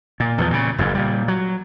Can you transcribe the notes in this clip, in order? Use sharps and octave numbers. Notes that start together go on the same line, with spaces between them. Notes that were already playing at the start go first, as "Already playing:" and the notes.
A#2
E2 D3 F3
A#2 C#3
F#1 F2 G#2
A#2 G3
F#3